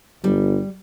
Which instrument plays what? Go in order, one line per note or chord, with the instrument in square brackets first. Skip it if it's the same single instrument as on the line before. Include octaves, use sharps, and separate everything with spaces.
[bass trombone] G1 [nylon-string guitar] G3